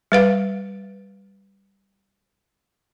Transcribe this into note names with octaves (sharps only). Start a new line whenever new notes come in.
G3 B4 F5